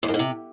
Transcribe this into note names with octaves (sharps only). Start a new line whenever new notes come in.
E2
F#2
G#2
C3